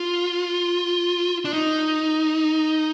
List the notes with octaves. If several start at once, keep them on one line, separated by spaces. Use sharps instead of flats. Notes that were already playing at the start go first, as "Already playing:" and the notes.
Already playing: F4
D4
D#4